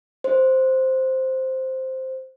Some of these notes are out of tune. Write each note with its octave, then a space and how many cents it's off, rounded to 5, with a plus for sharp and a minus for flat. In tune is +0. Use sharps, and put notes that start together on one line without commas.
C5 +0